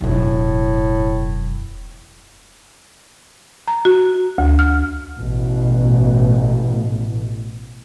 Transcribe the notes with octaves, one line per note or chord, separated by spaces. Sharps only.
E1 F#2 A2
A#5
F#4
D2
F6
A1 B2